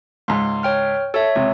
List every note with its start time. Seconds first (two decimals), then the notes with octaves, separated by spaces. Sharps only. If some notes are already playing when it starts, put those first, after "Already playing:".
0.28 C#2 G#2 C6
0.63 C#5 G5 F6
1.14 A4 C#5 E5
1.35 C#2 C3